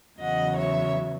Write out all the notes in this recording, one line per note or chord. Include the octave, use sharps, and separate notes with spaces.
E2 C#3 F#3 D#5 F#5
C#5 E5